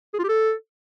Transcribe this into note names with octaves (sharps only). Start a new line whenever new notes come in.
G#4
F4
G4
A4